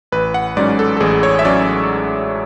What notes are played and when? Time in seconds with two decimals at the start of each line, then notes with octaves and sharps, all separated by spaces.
0.12 A1 B4
0.34 F#5
0.57 G#2 F#3 C#4 D5
0.79 A4
0.97 A4
1.00 A1 G#4
1.23 C#5
1.39 E5
1.45 F#3 C#4 D5